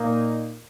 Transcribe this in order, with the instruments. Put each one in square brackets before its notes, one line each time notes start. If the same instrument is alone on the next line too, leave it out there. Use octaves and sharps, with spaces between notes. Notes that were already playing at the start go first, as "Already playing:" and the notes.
Already playing: [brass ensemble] A#2 A#3 D#4